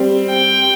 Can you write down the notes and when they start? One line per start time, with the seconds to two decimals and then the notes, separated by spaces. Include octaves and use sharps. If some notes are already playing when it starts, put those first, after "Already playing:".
Already playing: G3 C4
0.31 G5